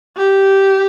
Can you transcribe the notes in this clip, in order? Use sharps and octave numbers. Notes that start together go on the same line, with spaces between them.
G4